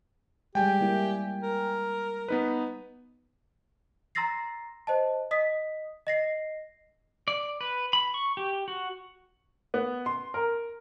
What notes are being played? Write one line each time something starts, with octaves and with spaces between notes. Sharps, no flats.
G3 G#3 G4 G5 G#5
G3 A#3 E4
A#4
B3 D#4 B4
A#5 C6 E6 A6 A#6 C7
C5 D#5 A5
D#5 D#6 B6
D#5 A#6 C7
D5
B4
B5
C#6
G4
F#4
B3
C6
A#4